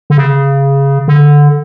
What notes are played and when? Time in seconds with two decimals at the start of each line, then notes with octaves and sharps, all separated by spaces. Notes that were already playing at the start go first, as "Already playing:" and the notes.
0.10 D3
0.17 C#3
1.08 D3